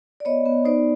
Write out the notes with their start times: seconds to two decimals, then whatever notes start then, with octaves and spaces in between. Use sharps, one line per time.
0.20 D5
0.25 B3 C#5 D#5
0.46 B3
0.65 D#4 C5 D5